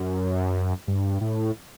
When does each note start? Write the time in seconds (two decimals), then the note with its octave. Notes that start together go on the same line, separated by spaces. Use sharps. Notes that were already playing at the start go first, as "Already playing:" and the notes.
Already playing: F#2
0.88 G2
1.21 A2